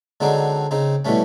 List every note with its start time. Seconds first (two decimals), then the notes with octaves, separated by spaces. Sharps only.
0.20 D3 F#3 G#3 C4 D4 D#4
0.71 C#3 C4 D#4
1.05 B2 E3 G3 A3 C#4